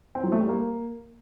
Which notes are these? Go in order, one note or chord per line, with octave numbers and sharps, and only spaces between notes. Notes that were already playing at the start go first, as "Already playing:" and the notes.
C4
F#3
A3
G3
A#3